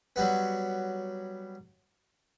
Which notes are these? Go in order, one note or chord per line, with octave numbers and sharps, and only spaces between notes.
F#3 G3 B3